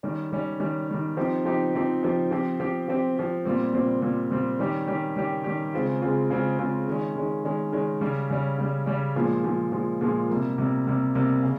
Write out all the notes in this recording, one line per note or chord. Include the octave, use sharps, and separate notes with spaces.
D#3 G3 C#4
D#3 G3 C#4
D#3 G3 C#4
D#3 G3 C#4
F3 C4 D#4 G4
F3 C4 D#4 G4
F3 C4 D#4 G4
F3 C4 D#4 G4
F3 C4 G4
F3 C4 G4
F3 C4 G4
F3 C4 G4
A#2 G3 C4
A#2 G3 C4
A#2 G3 C4
A#2 G3 C4
D#3 G3 C#4 G4
D#3 G3 C#4 G4
D#3 G3 C#4 G4
D#3 G3 C#4 G4
C#3 G#3 C4 F4
C#3 G#3 C4 F4
C#3 G#3 C4 F4
C#3 G#3 C4 F4
D#3 G#3 C#4
D#3 G#3 C#4
D#3 G#3 C#4
D#3 G#3 C#4
C#3 G3 C#4
C#3 G3 C#4
C#3 G3 C#4
C#3 G3 C#4
A#2 F3 G#3
A#2 F3 G#3
A#2 F3 G#3
A#2 F3 G#3
C3 G3 A#3
C3 G3 A#3
C3 G3 A#3
C3 G3 A#3
C#3